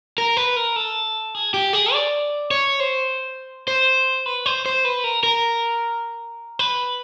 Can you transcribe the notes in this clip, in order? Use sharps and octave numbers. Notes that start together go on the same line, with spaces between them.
A#4
B4
A#4
A4
G#4
G4
G#4
D5
C#5
C5
C5
B4
C5
C5
B4
A#4
A#4
B4